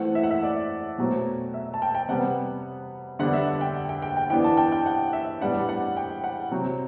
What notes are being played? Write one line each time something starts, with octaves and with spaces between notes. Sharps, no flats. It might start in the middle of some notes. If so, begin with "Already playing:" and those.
Already playing: E3 A3 C4 F#5
E5
F#5
E5
D5
B2 F#3 A3 C4
E5
A5
G5
G5
C3 G3 B3 F#5
D3 G3 B3 D4 F#5
E5
G5
G5
G5
G5
E3 B3 D4 G5
A5
G5
G5
F#5
E5
A2 G3 B3 D4 F#5
F#5
G5
F#5
C3 F#3 C4